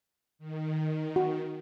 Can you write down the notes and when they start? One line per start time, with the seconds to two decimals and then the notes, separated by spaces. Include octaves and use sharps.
0.39 D#3
1.16 F#4